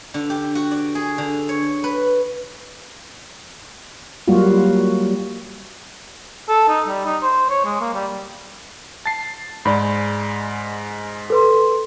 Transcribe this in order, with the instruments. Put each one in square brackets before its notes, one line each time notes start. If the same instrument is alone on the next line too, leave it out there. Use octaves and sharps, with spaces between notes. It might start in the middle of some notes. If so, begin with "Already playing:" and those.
[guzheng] D3
G4
F#4
D5
G#4
D3
C#5
B4
[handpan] F#3 G3 A#3 F4 F#4
[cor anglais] A4
D#4
G3
D#4
C5
C#5
G#3
A#3
G3
[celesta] A5 [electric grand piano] A6 C7
[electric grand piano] G#2 G#3 [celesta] D5 B5
[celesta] A4 B4 C6